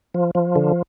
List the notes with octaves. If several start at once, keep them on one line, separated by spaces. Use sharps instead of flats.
F3
F3
D3